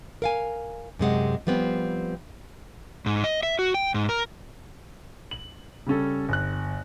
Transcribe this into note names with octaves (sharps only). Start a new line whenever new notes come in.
A#4 F5 G#5
F#2 C3 G#3 F#5
F3 G3 B3 C4
G#2
D#5
E5
F#4
G5
G#2
A#4
F#7
C#3 G3 C#4 A4
G1 F#6